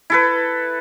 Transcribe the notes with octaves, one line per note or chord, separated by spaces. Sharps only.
E4 A4 B4